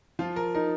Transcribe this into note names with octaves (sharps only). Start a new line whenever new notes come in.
F3 F4
A#4
D#4 A#4